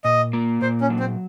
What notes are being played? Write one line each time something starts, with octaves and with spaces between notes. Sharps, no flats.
A#2 D#5
A#3
A#2 C5
C#4
F#3
C4